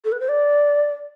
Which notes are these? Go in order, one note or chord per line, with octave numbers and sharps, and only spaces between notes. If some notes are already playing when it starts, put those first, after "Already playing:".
A4
B4
C5
D5